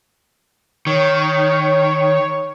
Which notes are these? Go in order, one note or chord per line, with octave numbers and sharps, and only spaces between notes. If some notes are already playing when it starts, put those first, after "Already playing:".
D#3 C#5